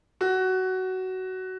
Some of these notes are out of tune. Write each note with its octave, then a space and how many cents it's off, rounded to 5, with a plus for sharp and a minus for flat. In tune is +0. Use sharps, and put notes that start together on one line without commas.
F#4 +15